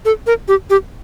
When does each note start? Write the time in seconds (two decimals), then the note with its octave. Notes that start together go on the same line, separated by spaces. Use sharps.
0.05 A4
0.27 A#4
0.48 G4
0.70 G4